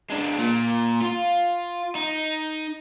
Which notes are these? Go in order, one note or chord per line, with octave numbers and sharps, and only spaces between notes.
G#3 D4
A#2
F4
D#4